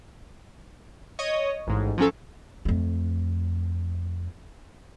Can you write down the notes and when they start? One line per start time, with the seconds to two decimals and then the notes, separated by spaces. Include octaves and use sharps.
1.19 C#5 D#5
1.67 A1 G#2
1.98 F3 F#3 C#4 A4
2.65 F2 A3